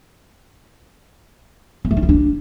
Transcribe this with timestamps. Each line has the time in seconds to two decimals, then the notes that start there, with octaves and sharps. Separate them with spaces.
1.85 A#3
1.91 A3
1.97 D#4
2.03 F4
2.09 D4